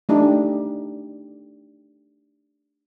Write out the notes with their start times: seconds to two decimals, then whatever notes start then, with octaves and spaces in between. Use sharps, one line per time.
0.09 A3 D4 D#4 G4